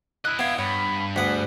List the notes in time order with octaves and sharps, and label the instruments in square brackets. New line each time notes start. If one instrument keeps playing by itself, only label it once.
[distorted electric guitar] E4 D#5 [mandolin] F#6
[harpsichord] B3 [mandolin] E5 F5 G5 [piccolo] G#6
[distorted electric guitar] G2 [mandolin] C#5 [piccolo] B5
[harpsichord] D2 F#5 [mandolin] B3 G#4 [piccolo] B6